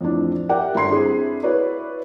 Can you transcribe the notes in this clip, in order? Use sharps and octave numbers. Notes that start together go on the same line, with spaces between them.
F2 A2 E3 D4
G4 A#4 D5 E5 F#5 G5
G1 G4 C6 C7
C4 D4 E4 G#4
E4 F#4 B4 C#5 D5